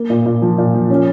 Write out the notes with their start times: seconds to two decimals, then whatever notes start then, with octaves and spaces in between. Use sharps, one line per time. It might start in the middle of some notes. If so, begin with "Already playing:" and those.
Already playing: A#3
0.10 A#2
0.26 A#2
0.42 F3
0.58 A#2
0.74 F3
0.90 C#4